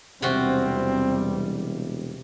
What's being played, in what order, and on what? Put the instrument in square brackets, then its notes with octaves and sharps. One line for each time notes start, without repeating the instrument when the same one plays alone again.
[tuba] E1 [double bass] E2 G3 [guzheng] C3 F4 F#4 [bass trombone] C4